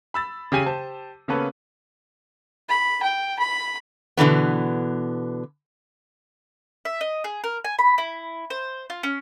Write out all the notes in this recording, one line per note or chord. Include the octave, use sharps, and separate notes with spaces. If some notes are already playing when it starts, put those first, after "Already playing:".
B5 E6 A6
C#3 G4 G#5 D#7
G4 C5 A5
C#3 A#3 B3 C#4 A4 B4
B5
G5
B5
B2 D3 E3 B3
E5
D#5
G#4
A#4
G#5
B5
E4
C5
F4
C#4